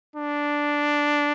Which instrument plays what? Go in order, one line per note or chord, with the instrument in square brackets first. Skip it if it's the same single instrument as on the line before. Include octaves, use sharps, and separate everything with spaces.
[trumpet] D4